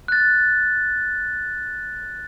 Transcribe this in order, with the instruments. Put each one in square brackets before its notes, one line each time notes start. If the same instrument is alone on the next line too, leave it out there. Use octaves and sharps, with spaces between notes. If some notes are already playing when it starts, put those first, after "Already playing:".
[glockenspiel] F#6 A6